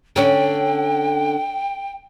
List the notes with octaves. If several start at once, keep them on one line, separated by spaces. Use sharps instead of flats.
D3 C#4 G5